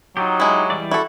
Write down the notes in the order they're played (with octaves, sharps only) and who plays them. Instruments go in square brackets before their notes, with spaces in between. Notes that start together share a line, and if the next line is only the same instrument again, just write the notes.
[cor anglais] F#3 [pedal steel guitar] D#4 F4 G4
[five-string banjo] G#3 E4
[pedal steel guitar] E3 G3 D5
[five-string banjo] E4 A4 [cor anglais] F#4